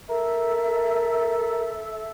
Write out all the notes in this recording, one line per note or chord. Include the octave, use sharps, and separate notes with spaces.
A4 A#4 E5